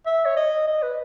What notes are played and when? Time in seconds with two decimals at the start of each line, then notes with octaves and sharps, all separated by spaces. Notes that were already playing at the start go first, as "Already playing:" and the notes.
0.06 E5
0.25 C#5
0.37 D#5
0.67 D#5
0.82 B4